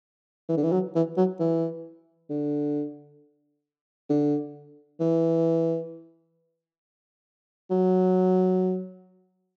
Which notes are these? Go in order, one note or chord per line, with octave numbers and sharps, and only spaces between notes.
E3
D3
E3
F#3
E3
F#3
E3
D3
D3
E3
F#3